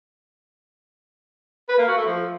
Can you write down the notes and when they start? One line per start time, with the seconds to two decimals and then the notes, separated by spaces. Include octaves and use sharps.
1.69 B4
1.78 A#3
1.88 F#4
1.97 A3
2.06 F3